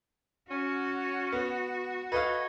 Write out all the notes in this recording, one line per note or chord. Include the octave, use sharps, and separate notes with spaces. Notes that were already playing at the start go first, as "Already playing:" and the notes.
C#4 F#4
B3
A4 B4 C#5 D#5 F5